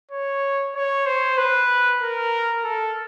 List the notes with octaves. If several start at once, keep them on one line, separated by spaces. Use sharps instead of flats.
C#5
C#5
C5
B4
A#4
A4